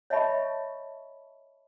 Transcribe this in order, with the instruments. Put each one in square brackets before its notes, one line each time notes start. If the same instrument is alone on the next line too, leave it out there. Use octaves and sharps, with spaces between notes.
[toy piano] C#5 D#5 E5 A5 B5 C#6